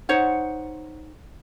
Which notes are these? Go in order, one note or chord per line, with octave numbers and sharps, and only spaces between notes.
D#4 C5 C#5 F#5